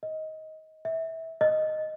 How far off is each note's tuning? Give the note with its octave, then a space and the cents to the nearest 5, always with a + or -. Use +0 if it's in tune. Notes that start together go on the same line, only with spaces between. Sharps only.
D#5 +15
E5 -20
D#5 -5